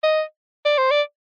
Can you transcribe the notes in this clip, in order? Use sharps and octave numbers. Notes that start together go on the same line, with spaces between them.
D#5
D5
C5
D5